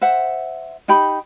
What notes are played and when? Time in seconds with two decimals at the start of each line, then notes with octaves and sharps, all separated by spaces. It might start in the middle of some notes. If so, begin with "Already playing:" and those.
0.01 C5 E5 F#5
0.88 D#4 G4 G5 B5